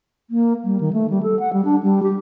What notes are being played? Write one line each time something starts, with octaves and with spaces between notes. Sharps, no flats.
A#3
G3
D#3
A3
G3
A4
F#5
G3
D4
G3
G4